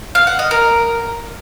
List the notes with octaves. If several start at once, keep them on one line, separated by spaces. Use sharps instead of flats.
F5
F#5
D#5
A#4